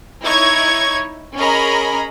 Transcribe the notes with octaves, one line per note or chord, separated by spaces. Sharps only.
D#4 E4 C#5 C#6 G#6
C#4 G#4 A#4 D#5 A#5 B5